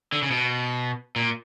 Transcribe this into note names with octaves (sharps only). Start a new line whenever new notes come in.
D3
C#3
B2
A#2